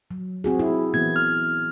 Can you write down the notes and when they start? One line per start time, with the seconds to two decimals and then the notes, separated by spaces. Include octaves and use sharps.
0.11 F#3
0.44 C4 F#4 G#4
0.59 E4
0.94 E3 A#3 B3 G#6
1.16 F6